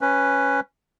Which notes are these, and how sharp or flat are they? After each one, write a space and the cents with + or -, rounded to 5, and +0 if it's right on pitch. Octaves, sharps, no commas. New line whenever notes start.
C#4 -5 B4 +5